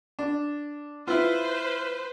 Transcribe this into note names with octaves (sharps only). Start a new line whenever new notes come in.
D4
E4 F4 B4 C5